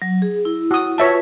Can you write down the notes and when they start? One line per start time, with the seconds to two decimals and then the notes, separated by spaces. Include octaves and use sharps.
0.02 F#3
0.22 G#4
0.45 E4
0.71 F#4 D#6
0.98 F4 B4 C#5 E5 A5